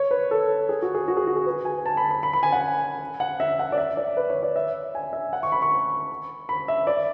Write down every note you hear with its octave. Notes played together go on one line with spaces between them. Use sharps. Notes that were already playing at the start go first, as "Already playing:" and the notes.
Already playing: C#5
B4
A4
G#4
F#4
G#4
F#4
G#4
F#4
G#4
B4
G#5
A5
B5
B5
B5
B5
G#5
F#5
F#5
E5
F#5
D5
E5
D5
B4
C#5
D5
E5
G#5
E5
F#5
C#6
B5
C#6
B5
E5
D5